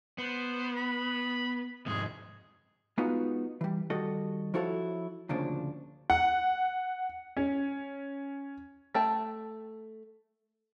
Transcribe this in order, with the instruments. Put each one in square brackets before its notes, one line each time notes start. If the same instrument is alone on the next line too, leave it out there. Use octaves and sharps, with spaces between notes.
[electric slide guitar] B3 [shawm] C5
[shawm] B5
[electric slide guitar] F2 G#2 C3 [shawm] G#4
[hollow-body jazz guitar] G#3 B3 D#4 F4 F#4
E3 G3
D#3 G3 F#4 A4 D#5
F3 E4 F#4 A4 C#5
D2 A#2 C#3 F3 D4
[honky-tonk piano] F#5
C#4
[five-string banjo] A3 G5 A5